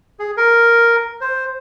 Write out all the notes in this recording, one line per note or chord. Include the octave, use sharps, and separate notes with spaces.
G#4
A#4
C5